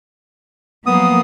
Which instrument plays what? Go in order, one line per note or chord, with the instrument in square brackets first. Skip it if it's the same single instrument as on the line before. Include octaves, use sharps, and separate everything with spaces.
[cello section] F3 F#3 A#3 [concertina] B3 D#6